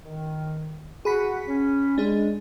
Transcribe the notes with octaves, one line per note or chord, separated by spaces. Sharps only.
D#3
F#4 G#4 F#5 B5 B6
C#4
G#3 D4 G#4